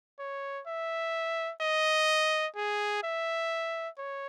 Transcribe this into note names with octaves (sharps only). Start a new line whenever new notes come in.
C#5
E5
D#5
G#4
E5
C#5